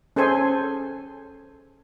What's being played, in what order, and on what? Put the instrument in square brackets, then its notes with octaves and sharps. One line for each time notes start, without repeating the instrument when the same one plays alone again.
[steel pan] C#4 G#4 A4 C5 G#5